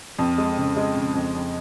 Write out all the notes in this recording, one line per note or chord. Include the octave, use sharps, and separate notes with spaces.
F2
G#3
C#3
G#3
C#3
F2
F2